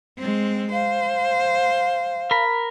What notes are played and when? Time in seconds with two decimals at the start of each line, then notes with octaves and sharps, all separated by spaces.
0.18 G#3 C4
0.72 C5 F5
2.31 A#4 B5